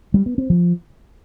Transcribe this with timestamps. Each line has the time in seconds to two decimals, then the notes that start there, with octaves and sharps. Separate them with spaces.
0.14 G3
0.26 B3
0.38 C4
0.50 F3